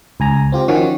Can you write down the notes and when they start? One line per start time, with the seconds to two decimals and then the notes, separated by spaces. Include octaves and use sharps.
0.20 C#2 G#5 A#5
0.52 C4 F4 G4
0.68 D#3 F3 C#4 F#4